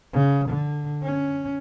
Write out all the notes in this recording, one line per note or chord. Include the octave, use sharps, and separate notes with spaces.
C#3
D3
C#4